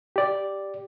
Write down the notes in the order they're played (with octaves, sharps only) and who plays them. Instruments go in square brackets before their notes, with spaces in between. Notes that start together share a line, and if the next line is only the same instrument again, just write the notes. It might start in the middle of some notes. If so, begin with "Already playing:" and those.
[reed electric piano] G4 D5